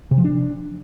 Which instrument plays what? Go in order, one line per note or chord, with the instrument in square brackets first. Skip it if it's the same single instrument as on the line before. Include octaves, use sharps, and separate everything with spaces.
[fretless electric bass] C3
F3
D4